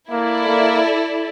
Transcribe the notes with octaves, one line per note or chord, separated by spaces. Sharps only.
A#3 E4 A4 D5
A#3